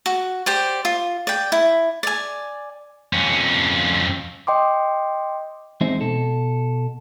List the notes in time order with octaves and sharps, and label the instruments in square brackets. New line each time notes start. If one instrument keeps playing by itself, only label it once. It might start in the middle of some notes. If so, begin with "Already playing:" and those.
[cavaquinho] F#4
G4 C5 D5
F4
D5 G5
E4
D5 G#5
[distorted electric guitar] F2 C#4
[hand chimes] D#5 G5 C6 D6
[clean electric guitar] E2 G#3 C4 D#4 C5 E5
B2 A4